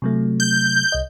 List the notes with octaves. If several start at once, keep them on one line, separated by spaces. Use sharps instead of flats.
C3 F#3 A3
G6
C2 D#5